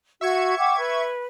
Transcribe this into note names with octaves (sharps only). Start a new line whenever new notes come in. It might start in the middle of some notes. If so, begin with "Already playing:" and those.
F#4 E5 C#6 G#6
F#5 G5 D6
B4